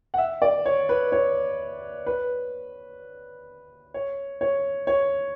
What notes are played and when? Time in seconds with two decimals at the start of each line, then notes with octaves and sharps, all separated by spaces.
0.14 F#5
0.18 E5
0.42 D5
0.66 C#5
0.89 B4
1.12 C#5
2.06 B4
3.94 C#5
4.41 C#5
4.87 C#5